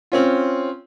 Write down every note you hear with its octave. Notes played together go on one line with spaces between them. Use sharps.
C4 C#4 F4